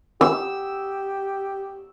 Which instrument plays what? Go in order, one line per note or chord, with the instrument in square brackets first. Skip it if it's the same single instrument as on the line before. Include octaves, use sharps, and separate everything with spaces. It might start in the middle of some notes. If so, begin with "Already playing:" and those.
[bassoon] G4 [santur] E6